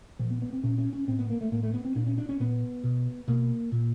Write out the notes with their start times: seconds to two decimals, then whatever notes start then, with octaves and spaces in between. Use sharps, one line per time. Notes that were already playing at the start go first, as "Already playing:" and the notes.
0.19 A#2 F3
0.30 B3
0.42 B3
0.53 C4
0.63 A#2 C#4
0.78 C#4
0.93 C#4
1.07 A2 C4
1.19 B3
1.30 A#3
1.41 A3
1.52 A2 A#3
1.63 A3
1.74 B3
1.85 C4
1.95 A#2 D4
2.07 C#4
2.18 D4
2.29 C#4
2.40 A#2 B3
2.83 B2
3.28 B2 A#3
3.72 A#2